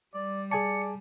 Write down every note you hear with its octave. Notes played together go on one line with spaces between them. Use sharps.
G3 D5
G#4 D5 G#5 A5 C#7